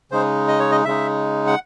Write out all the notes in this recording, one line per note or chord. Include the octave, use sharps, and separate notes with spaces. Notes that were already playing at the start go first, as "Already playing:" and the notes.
C#3 G#3 D#4 C5
D#5
C#5
D#5
C#3 G#3 D#4 E5
F#5